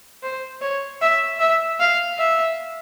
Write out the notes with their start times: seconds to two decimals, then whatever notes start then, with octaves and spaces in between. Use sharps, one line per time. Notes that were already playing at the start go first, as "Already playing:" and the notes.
0.23 C5
0.61 C#5
1.01 E5
1.40 E5
1.80 F5
2.18 E5